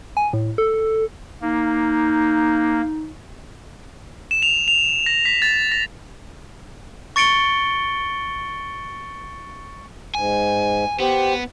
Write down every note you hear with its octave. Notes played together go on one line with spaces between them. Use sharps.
G#5
A2
A4
A#3 D#4
E7
F7
F7
A#6
B6
A6
A#6
C#6 A6 C#7 D7 G7
G#2 G#5
B3 G4 C5